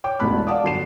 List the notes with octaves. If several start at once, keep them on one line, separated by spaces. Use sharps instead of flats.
C#5 G5 D6
E1 A1 B2 A5 B5 F#6
D5 F5 F#5 A5 D6 D#6
G1 F#3 C7 E7